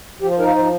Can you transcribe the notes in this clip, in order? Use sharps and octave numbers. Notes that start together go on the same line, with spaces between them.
F3 G4
C5
D#4 A#4
F5
F3 C5